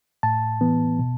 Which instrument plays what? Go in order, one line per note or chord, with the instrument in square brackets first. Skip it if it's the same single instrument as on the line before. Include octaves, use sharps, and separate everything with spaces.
[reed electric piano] A2 A5
E3 B3
B2